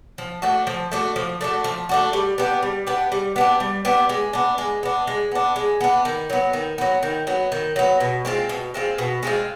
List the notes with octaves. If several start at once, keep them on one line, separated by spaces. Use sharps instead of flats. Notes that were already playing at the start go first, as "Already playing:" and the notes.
F3
A3 D4 F#4
F3
A3 D4 F#4
F3
A3 D4 F#4
F3
A3 D4 F#4
G3
B3 D4 G4
G3
B3 D4 G4
G3
B3 D4 G4
G3
B3 D4 G4
G#3
B3 D4
G#3
B3 D4
G#3
B3 D4
G#3
B3 D4
D#3
F#3 B3
D#3
F#3 B3
D#3
F#3 B3
D#3
F#3 B3
B2
G#3 C4 F4
B2
G#3 C4 F4
B2
G#3 C4 F4